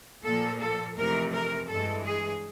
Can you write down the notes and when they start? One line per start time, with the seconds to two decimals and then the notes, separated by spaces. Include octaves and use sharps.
0.23 A#2 F3 A#3 A4
0.60 A4
0.96 F2 C3 E3 A3 A#4
1.32 A#4
1.68 G2 E3 G#3 A4
2.04 G#4